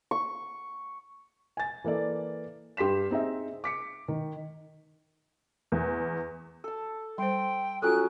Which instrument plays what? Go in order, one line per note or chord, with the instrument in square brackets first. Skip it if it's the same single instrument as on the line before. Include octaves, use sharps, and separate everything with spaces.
[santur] C#6
[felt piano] G#5 A6
E3 A#3 A4 D5
G2 G4 C6 B6 E7
C4 D#4 G#4 E5
D6 B6 C#7
D#3
[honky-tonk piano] E2
[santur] A4 A5
[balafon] G3 C5 [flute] G5 [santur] C6
[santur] F#3 C#4 D#6 [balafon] F4 A4 [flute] F#6